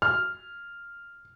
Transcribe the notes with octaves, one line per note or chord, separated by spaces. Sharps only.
F6